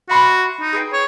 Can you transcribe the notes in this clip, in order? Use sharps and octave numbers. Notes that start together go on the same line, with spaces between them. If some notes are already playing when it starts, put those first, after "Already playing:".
F#4 E5 B5 C6
D#4
G#4 B4 G5
C#5